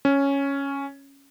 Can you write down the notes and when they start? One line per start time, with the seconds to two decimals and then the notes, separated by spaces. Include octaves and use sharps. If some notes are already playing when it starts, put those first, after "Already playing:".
0.05 C#4